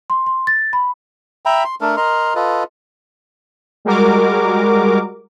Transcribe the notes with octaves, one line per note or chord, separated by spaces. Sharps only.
C6
C6
A6
B5
E5 G5 A#5 B5
C6
A3 D4 A4 A#4
A#4 D#5 A#5 C6
F4 A4 B4 D#5
G3 G#3 F#4 A#4 D6